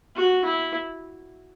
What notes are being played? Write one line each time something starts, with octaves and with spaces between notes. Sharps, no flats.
F#4
E4